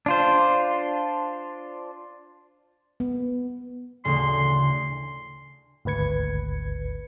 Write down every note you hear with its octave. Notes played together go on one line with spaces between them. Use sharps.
D4 F4 C5
B3
A1 D2 C#3 C6
G#1 D2 B4 G#6 C#7